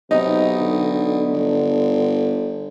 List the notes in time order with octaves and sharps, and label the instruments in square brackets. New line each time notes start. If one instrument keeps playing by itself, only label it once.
[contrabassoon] B1 [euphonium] C3 [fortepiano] D#4
[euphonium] D3
[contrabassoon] G1